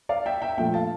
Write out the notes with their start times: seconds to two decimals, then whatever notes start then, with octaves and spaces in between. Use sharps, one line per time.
0.09 D5 F5
0.26 E5 G5
0.42 E5 G5
0.58 A#2 F3 A3 E5 G5
0.74 F5 A5